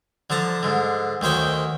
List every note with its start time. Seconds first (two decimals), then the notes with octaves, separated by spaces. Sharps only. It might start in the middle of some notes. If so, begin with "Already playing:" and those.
0.30 D3 F3 A5 A#5
0.63 G#2 D3
1.21 D2 D#3 C5 C#5 G5